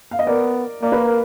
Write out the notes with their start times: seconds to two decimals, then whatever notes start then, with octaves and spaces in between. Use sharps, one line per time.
0.11 F5
0.19 D#5
0.26 B3 A#4 D5
0.82 A#3 D5
0.92 B4
1.03 A#4